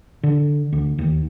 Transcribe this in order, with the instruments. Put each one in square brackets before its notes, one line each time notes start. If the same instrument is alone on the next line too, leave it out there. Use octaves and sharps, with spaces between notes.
[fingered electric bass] D3
D2
D#2